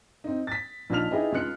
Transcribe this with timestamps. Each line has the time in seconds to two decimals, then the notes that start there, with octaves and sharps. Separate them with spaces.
0.24 C4 D#4
0.47 A6 B6
0.90 A#1 F3 D#4 A5 F6 F7
1.11 D#4 E4 G4 G#4 B4 D#5
1.32 C#2 D#4 F4 F#6 C#7